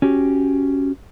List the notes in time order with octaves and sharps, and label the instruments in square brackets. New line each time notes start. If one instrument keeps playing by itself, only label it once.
[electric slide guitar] C#4 F#4 G4